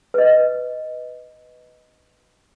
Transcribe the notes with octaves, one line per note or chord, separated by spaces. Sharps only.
B4 D#5